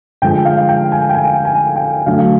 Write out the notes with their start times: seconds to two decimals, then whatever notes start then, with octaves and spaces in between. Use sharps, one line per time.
0.22 D3 F3 G#3 G5
0.45 F5
0.69 G5
0.92 G#5
1.09 G5
1.14 G#5
1.45 G#5
1.76 G5
2.06 D3 F#3 A3 F5